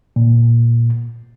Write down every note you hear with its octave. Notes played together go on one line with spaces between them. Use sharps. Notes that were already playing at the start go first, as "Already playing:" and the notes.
A#2